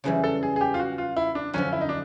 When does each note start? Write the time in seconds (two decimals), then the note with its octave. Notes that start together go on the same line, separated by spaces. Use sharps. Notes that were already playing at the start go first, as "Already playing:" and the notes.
0.04 F#2 C#3 E3 G3 G#4
0.24 A4
0.43 G#4
0.56 G#4
0.61 G4
0.74 F4
0.80 F#4
0.98 F4
1.17 E4
1.35 D4
1.53 F#2 D3 F3 C#4
1.73 E4
1.81 D#4
1.89 D4